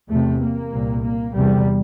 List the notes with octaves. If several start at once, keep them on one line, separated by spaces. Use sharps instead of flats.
E2 C3 A3
A#3
C2 A#2
A#3
E2 C3 G3